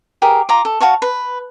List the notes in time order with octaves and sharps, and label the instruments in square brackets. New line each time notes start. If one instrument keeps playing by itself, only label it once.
[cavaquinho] G4 G#4 A#4
F4 A#5 D6
A4
F#4 F5 A5 C#6
B4